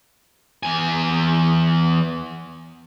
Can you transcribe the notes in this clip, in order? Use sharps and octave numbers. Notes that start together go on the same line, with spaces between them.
E2 G#5